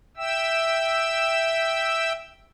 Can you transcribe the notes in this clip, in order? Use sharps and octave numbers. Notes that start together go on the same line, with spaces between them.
E5 G5 E6